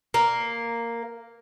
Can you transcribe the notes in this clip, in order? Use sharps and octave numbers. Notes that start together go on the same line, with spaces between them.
A#3